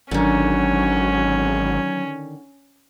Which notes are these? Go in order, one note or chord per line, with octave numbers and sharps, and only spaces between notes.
G#1 D3 D#3 F#3 C#4